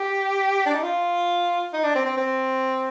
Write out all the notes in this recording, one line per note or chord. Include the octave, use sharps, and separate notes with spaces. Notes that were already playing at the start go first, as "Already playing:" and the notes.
Already playing: G4
D4
D#4
F4
D#4
D4
C4
C4
C4